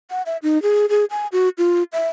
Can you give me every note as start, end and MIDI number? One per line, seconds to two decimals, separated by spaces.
0.11 0.22 78
0.26 0.37 76
0.43 0.61 63
0.62 0.86 68
0.89 1.05 68
1.11 1.27 80
1.32 1.49 66
1.58 1.83 65
1.93 2.08 76